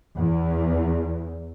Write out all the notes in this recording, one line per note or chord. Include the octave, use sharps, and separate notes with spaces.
E2